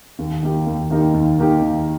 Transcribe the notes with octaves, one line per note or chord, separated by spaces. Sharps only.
D#2
D#3 A#3 D#4 G4
D#2
D#3 A#3 D#4 G4
D#2
D#3 A#3 D#4 G4
D#2